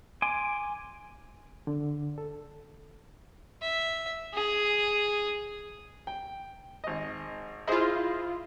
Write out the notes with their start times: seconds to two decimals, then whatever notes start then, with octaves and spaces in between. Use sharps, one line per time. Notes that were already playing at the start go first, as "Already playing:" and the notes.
0.22 G#5 C6 D6
1.67 D3
2.18 A4
3.62 E5
4.34 G#4
6.07 G5
6.84 G#1 D#5
7.68 E4 F4 G#4 C5 D#5